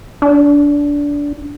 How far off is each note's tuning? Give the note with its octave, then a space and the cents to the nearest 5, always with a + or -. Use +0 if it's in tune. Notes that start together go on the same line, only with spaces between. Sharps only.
D4 -20